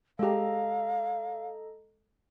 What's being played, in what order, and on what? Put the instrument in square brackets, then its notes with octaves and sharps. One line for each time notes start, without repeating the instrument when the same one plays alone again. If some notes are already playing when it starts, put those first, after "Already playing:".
[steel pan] G#3 G4 [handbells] A4 D#5 A#5 [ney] F5